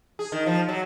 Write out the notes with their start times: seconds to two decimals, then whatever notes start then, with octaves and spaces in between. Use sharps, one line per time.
0.19 G#4
0.32 D#3
0.46 F3
0.68 F#3